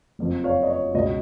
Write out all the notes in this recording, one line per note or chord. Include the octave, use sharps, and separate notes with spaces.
F#1 F2 F3
C#5 F5
D#5
C#5
C#2 B2 F#3 D#5